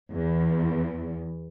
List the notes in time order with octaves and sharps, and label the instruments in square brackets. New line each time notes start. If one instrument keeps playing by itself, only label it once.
[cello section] E2